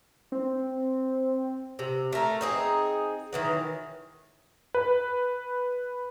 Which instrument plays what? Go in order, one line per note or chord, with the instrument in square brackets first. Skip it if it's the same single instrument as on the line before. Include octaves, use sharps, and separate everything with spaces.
[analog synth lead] C4
[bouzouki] C3
A3 A#4
C4 D#4 G#4
D#3 E3 F#3
[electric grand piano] B4